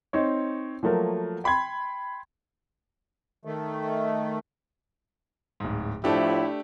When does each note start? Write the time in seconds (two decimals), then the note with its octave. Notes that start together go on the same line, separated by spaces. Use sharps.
0.13 C4 D#4 C#5
0.83 F3 F#3 A3 A#3 A#4
1.44 G5 B5 C6 G#6
3.45 D#3 A3
5.60 D1 G#2
6.04 A2 F3 A3 D4 E4 G4